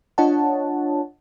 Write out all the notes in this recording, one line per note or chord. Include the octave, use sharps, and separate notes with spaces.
D4 F4 C#5 D#5 F#5 A5